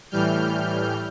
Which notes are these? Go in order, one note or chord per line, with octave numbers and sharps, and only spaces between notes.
A2 E3 G3 F6 G6